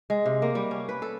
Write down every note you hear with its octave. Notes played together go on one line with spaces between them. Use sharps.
G#3
C3
A#3
G3
C#4
B4
A4